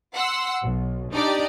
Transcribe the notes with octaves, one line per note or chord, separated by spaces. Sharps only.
F#5 C6 E6
B1
D4 D#4 G4 D5 D#5